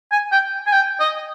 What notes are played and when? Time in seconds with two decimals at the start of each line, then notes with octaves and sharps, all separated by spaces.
0.12 G#5
0.32 G5
0.66 G#5
0.72 G5
1.00 D#5